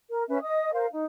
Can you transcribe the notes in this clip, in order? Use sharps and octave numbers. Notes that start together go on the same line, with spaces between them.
A#4
C#4 B4 E5
D#5 D#6
A#4 C5 F5
D#4